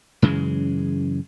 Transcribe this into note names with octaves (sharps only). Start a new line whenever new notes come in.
F#2 C#3 E3 G#3